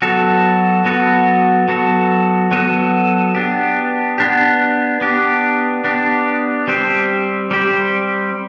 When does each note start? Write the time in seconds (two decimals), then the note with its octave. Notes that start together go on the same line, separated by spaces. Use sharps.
0.02 F#3 B3 F#4 A4
0.85 F#3 B3 F#4 A4
1.68 F#3 B3 F#4 A4
2.51 F#3 B3 F#4 A4
3.35 B3 D4 G4
4.18 B3 D4 G4
5.01 B3 D4 G4
5.84 B3 D4 G4
6.68 G3 C4 G4 C5
7.51 G3 C4 G4 C5